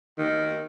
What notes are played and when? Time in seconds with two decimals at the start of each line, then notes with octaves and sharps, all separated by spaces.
0.18 D#3